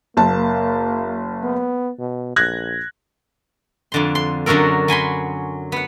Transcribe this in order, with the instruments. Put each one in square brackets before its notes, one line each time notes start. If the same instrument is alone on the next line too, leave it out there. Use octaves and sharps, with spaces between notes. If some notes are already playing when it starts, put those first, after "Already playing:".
[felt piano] F#1 A5 [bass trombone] A#3
[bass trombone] B3
B2
[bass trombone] A#1 [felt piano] F#6 G#6 A#6
[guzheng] F2 D3 C6
C6
F#2 D3 F#3 F#4 A4 A#4
F#3 G#5 B5 C6
B3 F#5